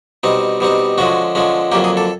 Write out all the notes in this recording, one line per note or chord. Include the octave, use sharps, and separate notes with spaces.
B2 G3 C4 D#4
B2 G3 C4 D#4
D3 F3 G#3 C#4 F#4
D3 F3 G#3 C#4
F2 D3 F#3 A#3 G4
G#4
A4